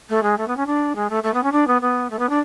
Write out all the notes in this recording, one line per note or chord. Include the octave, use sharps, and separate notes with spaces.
A3
G#3
A3
B3
C#4
D4
G#3
A3
A3
B3
C#4
D4
B3
B3
A3
B3
D4